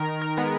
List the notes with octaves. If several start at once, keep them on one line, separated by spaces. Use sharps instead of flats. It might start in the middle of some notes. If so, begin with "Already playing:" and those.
Already playing: D#3 A#4
A#4
G#3 B3